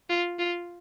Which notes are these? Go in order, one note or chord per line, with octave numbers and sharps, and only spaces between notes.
F4
F4